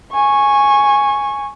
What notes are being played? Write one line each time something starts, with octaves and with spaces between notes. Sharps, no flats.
G#5 C#6